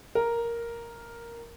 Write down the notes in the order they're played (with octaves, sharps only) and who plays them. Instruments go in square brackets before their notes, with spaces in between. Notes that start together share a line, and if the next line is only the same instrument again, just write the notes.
[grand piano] A#4